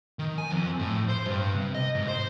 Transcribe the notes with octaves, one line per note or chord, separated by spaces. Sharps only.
D#3
G#5
F2
A2
C5
G2
C3
D#5
G#2
C5